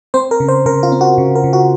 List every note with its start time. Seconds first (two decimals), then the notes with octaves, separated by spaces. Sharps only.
0.14 C4 C5
0.31 A#4
0.40 C#3
0.48 C5
0.66 C#3 A#4
0.83 F4
0.92 C4
1.01 F#4
1.18 C#3
1.36 A#4
1.44 C#3
1.53 F#4